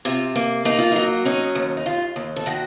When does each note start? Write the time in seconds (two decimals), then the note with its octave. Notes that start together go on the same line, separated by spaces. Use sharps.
0.05 C3 F4
0.36 A#3
0.65 A#3 D#4
0.79 F4
0.92 F#3 D#4
1.25 C#4 D#4
1.55 D#2
1.77 D#4
1.86 D#2 F4
2.16 D#2
2.36 A4
2.46 D#3 F#4